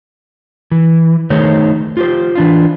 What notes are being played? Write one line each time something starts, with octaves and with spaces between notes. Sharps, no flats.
E3
D#3 A3 D#4 G#4 C5 C#5
F4 G4 C5
E3 D4 F4